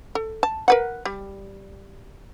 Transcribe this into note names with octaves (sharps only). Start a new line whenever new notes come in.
A4
A5
A#4 B4 F#5
G3